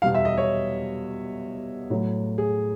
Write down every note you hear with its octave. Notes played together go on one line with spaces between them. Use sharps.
E2 B2 G3 F5
E5
D#5
C#5
A2 F#3
G#4